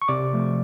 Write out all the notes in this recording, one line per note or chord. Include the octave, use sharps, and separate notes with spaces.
C#6
C3 D5 D6
F3 A3